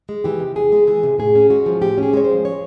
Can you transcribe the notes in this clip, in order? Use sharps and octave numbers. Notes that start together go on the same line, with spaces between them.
G#3
E3 G4
C3
E2 G#4
G#3
E3 G#4
C3
A2 G#4
C#4
G#3 F#4
F3
A2 G4
C#4
G#4
G#3 C#5
C5
F3
C#5